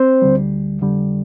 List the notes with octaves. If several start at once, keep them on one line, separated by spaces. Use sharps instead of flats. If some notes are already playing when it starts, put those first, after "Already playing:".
Already playing: C4 C5
D2 D3 G3
F2 D3 G3